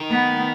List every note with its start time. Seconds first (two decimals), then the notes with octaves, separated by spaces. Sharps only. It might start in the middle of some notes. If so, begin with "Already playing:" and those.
Already playing: D#3
0.10 B3